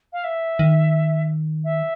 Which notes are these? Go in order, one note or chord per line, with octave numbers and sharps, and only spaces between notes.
F5
E5
D#3
E5